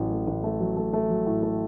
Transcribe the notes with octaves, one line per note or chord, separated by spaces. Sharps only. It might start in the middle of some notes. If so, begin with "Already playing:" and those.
Already playing: A1 A2 F#3
A3
A1
A3
F#3
A3
A3
F#3
A2
A3